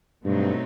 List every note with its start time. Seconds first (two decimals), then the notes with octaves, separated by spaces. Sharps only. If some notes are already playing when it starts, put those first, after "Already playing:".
0.25 G2 B2 F#3 A3 C4 D#4